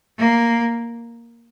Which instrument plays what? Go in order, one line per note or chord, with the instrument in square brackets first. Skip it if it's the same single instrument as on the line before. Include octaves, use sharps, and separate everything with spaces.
[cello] A#3